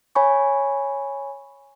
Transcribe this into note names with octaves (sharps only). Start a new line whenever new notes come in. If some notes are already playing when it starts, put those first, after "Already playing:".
C#5 G#5 B5 C#6